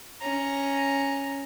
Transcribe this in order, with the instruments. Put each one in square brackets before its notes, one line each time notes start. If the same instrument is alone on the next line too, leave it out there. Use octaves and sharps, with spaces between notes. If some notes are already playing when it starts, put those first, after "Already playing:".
[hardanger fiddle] C#4 A#5